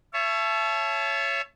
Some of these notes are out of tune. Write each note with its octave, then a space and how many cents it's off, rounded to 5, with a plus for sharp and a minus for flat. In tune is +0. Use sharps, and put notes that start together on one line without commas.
C#5 +0 E5 +30 A5 -25